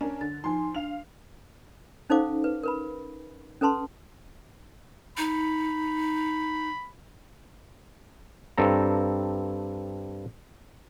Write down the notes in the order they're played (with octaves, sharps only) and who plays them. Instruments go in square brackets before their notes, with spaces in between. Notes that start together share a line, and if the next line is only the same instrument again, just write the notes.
[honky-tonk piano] C#4 D4 A#4
[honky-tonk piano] D3 [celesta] A6
[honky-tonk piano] F3 C6 [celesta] D#4 G#5
[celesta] D4 [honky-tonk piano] F5 F7
[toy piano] C#4 D#4 A4 C5 F5 D6
B4
A#4 B4 B5
C#4 A4 B4 A5 C6
[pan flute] D#4 [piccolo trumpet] B5
[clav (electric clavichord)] G2 C4 A4 A#5